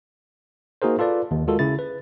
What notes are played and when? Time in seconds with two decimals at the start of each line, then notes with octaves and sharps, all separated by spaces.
0.82 A#3 D#4 F#4 G#4 A#4 C5
0.99 F4 A4 B4 D5
1.31 D#2
1.48 G#3 F4 F#4 A4 A#4
1.59 C#3 E4 A6
1.79 B4